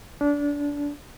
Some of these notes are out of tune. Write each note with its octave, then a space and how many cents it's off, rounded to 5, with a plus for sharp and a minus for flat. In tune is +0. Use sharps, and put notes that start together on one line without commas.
D4 -25